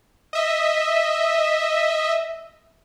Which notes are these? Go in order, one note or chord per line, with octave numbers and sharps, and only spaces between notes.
D#5 E5